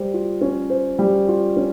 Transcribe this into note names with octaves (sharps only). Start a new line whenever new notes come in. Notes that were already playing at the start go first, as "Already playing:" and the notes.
Already playing: G3 C5
F4
C#4
C5
G3
F4
C#4